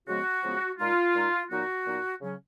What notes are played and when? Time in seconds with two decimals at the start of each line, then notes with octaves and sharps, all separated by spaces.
0.07 C#3 F3 G#3 B3 F#4
0.44 C#3 F3 G#3 B3
0.79 A#2 G#3 D#4 F4
1.15 A#2 G#3 D#4
1.50 A#2 F#3 B3 D#4 F#4
1.86 A#2 F#3 B3 D#4
2.22 C#3 F#3 C#4